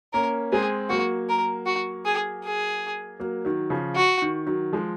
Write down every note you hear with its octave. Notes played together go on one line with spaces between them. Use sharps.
A#3 C#4 A#4
G#3 C4 G#4
F#3 A#3 F#4
A#4
F#4
G#4
G#4
F#3 A#3
D#3 F#3
C#3 F3
F#4
D#3
D#3 F#3
F3 G#3